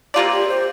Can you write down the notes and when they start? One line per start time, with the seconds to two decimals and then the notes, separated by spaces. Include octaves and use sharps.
0.14 C3 A#3 F4 G4 D5
0.31 G4
0.48 C5